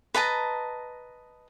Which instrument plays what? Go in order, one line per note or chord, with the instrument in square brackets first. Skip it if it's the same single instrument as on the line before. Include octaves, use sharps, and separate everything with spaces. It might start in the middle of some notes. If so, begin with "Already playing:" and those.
[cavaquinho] B4 D#5 A5 A#5